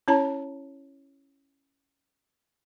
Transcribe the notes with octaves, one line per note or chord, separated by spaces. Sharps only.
C#4 E4 C#5 A5 A#5